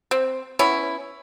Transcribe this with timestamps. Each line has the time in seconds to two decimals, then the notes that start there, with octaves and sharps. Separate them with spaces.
0.11 C4
0.59 B3 C#4 E4